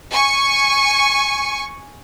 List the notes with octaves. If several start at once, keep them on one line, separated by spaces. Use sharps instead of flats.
G#5 C#6